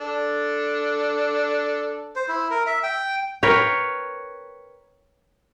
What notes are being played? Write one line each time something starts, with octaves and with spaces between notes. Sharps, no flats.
D4 A4
C5
E4
A#4
E5
G5
A#4 B4 C#5 G5